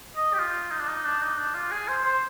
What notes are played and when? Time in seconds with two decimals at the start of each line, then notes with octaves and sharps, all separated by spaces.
0.16 D#5
0.33 G4
0.39 F4
0.71 D#4
0.80 D4
0.88 D#4
1.05 D4
1.22 D#4
1.38 D4
1.54 F4
1.71 G#4
1.88 C5
2.04 C5